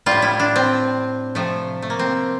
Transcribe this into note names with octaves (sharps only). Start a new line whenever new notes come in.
A2 G3 F4
E4
D4
C4
C3 F3 A3
A3
A#3
C4